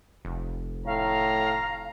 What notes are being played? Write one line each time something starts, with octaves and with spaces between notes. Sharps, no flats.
F1
A2 F5 A#5